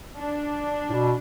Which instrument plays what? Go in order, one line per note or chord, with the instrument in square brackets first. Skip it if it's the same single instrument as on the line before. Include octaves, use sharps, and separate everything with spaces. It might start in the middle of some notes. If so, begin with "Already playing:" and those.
[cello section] D4
[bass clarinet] A2
B2